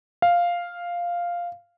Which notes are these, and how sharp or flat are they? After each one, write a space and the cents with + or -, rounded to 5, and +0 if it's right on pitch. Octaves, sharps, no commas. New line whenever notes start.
F5 +0